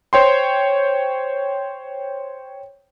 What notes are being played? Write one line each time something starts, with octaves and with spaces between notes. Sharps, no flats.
C5 C#5 G5 C6